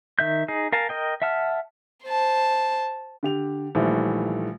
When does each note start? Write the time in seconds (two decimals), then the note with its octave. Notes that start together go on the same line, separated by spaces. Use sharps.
0.19 D#3 E5 G6
0.48 D#4 G#4
0.72 A#4 F5 G#5 A5
0.89 A#4 D#5 G5
1.22 E5 F#5 A5 F6
2.05 C5 A5
3.23 D3 G4 F7
3.75 A#1 D#3 E3 G3 A3